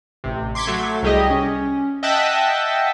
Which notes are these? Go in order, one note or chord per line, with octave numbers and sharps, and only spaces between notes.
A1 C3
C6 D6 G#6 B6 C#7
F#3 A3
C2 G3 G4 G#4 D#5
C#4
D#5 E5 F#5 G5 A5 B6